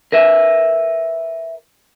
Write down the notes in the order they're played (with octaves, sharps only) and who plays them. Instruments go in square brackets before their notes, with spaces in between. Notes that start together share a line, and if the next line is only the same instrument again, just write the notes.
[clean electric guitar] A#4 B4 E5